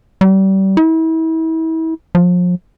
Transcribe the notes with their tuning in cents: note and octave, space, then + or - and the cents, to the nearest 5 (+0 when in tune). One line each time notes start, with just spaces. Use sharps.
G3 -30
E4 -35
F3 +35